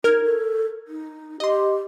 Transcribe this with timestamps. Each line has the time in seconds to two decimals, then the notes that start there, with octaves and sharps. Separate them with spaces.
0.04 D#4 A#4 F6 G#6
0.24 A4
0.88 D#4
1.40 G4 D#5 C6